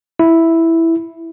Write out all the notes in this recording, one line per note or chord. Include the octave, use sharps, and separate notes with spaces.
E4